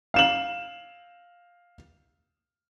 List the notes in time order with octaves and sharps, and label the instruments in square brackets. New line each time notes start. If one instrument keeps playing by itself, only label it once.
[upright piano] F5 E7 F#7